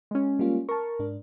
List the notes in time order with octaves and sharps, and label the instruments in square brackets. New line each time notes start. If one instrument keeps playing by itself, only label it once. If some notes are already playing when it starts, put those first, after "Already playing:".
[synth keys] G#3 C#4
[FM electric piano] G3 A#3 F4
[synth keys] A#4 [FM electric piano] A5 C#6
[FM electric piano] G#2 D4